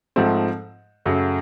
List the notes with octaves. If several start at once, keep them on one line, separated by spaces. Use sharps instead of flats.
G#2 F3 A3 C4
F#2 C#3 F#3 A3